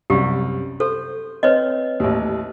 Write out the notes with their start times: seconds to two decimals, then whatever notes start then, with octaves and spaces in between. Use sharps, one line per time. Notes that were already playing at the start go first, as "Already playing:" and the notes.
0.10 C2 F#2 G4
0.80 A4 C5
1.43 C4 B4 C#5 D#5
2.00 A1 D#2